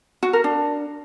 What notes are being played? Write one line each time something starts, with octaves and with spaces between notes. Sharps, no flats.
F#4
A#4
D4